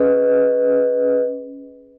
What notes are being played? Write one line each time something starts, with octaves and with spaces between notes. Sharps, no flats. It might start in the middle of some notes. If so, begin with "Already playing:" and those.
Already playing: C#4 G#4 B4 D#5